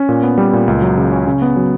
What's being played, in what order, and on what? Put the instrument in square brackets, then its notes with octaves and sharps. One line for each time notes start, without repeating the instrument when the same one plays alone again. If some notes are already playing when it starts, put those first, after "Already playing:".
Already playing: [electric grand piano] C#4
A#2
B3
G3
A#2
C#2
F#3
C#3
C#4
C#3
B3
F#3